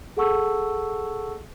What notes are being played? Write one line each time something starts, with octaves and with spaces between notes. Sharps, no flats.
G#4 A4 F#5 A5 C#6 E6